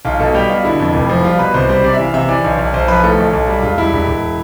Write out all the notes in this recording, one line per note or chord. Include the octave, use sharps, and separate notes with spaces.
B1 F4
B2 A4
G3 G4
B2 F4
D3 E4
F2
F1
F3
G3 F4
B2 B4
C2 C5
G3 C5
C3 D5
E5
E3 F5
C3 E5
E3 D5
B1
B1
B1 C5
F3 B4
A2 A4
B1
B1
G3
E1 F4
G3 E4
E1
E1